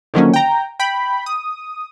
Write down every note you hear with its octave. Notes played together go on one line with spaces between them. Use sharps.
D3 D#3 F3 F#3 A#3 C#4
G5 A#5
G5 B5
D#6